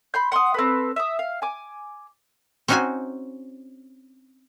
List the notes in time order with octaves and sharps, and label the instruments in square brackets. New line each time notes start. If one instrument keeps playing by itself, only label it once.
[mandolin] B5 C6 G6
F#5 C6 C#6 D#6
C4 A4 B4
E5 D#6
F5
G#5 D6
[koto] C4 C#4 D#4 F#4 C5 G#5